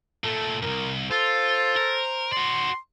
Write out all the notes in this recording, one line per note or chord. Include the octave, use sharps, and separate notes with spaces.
A#2 A3 A4
C2 F#2 A#4
F4 A4 C5
A#4
F#4 D5 C6